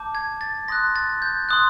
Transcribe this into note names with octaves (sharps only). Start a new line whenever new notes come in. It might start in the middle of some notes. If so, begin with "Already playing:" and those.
Already playing: A5 D6 G6
G#6
A6
C6 D#6 F#6 A#6
A6
G6
C6 D#6 F#6